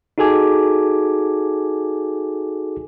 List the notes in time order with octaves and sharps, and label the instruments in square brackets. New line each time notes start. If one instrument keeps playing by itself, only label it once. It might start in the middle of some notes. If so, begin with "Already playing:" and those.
[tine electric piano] D#4 F#4 G#4 A4 G#5 D6